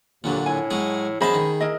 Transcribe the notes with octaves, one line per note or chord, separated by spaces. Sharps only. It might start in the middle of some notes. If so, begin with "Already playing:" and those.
D#2 A#2 D3 F#3
A2 G#5
F#3 G#3 G#4
F#2 G#4 C5 D#5 E5 A5 B5
D#3
E4 A#4 D#5